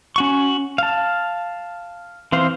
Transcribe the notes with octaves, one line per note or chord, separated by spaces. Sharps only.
C#4 F#4 C#6
F5 A5
E3 C4 C5 F5